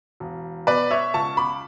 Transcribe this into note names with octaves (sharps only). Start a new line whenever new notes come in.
E1
B2 B4 D5
C#5 E5
C#2 A5 C#6
B5 D6